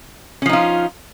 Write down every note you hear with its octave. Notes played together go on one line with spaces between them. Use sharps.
F3 C#4 D#4 F4